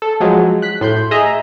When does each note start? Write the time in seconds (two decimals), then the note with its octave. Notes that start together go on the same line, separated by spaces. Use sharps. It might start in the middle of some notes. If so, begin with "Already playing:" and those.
0.02 A4
0.20 F3 F#3 G#3
0.62 F#6 B6
0.81 A2 C6 G6
1.11 G#4 D#5 E5 A#5